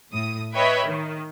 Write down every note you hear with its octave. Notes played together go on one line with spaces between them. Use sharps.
A2 D#6
B4 C#5 D#5 E5 G5 B5
D#3